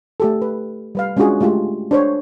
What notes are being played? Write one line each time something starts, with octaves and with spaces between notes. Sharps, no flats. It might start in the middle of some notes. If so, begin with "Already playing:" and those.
A3 G4 A4
B4
G3 B4 F5
G#3 C#4 D4 F4 F#4 G#4
G#3 A3 F4 G4
D4 C5 C#5